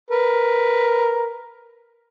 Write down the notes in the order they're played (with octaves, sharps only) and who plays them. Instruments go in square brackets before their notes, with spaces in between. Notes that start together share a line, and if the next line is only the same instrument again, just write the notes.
[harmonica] A#4 B4